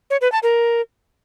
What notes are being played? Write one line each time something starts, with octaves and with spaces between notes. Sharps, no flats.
C#5
B4
A5
A#4